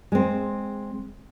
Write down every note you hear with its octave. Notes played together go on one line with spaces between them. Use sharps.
G#3 C4